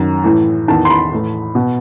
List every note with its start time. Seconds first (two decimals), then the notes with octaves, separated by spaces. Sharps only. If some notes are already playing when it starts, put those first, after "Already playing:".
Already playing: F#2 D#3
0.24 A2 E3
0.68 E2 D#3 A5
0.85 C6
0.90 B5
1.12 A2 E3
1.55 B2